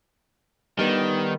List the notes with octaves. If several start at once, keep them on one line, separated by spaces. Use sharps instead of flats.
D#3 G3 B3